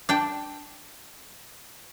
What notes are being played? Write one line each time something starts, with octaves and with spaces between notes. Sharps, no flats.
D4 G5